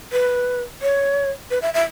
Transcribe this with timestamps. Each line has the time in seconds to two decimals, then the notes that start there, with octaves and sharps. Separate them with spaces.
0.12 B4
0.82 C#5
1.51 B4
1.62 E5
1.74 E5